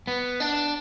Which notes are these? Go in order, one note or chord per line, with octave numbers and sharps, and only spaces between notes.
B3
D4